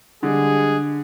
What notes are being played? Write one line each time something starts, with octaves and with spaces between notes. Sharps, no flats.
D3 G3 G#3 G#4